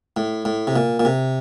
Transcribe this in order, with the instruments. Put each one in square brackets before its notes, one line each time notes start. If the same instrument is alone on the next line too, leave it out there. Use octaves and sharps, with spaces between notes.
[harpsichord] A2
A2
C3
A#2
A#2
C3